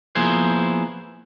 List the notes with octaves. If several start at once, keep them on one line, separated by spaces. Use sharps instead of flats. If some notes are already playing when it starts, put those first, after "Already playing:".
F3 A#3 B3 E4 G#4 C5